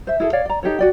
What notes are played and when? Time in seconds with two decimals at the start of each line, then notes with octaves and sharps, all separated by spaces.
0.07 C5 E5
0.20 E4 G#4 A4
0.33 C#5 D5 F5
0.45 D5 A#5
0.63 D#4 G4 A4 C#5
0.79 F#4 D5 G5